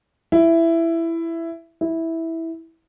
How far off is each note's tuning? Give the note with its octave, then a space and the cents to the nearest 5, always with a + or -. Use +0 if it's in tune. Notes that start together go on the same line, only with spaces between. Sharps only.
E4 +10
E4 -10